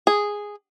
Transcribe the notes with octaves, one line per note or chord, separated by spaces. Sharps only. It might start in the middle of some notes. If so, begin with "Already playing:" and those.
G#4